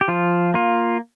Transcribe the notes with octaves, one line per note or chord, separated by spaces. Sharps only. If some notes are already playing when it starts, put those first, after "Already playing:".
G4
F3 F4
A#3 F4